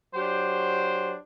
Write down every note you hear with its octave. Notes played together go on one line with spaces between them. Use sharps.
F#3 D4 G4 C5